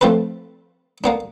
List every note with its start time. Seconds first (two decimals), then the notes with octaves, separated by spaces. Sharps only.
0.01 F3 A3 C4 A4 B4
1.04 A#3 B3 D4